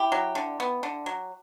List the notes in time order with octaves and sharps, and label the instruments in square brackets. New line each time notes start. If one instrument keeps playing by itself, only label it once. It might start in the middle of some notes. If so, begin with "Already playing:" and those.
Already playing: [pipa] E4 G4
F#3
D3
B3
D3
F#3